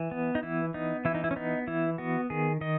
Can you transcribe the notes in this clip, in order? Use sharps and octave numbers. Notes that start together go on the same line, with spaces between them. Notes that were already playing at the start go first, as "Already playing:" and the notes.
Already playing: E3
B3
D#4
E3 E4
B3 D#4
E3 E4
D#4
E4
C#4
B3 D#4
E3 E4
B3 F#4
D#3 G#4
D#3 D#5